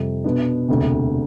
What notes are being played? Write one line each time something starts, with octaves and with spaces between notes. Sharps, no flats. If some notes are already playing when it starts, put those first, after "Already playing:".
Already playing: F2 C3 G3
B2 B3 D4
E1 D2 C3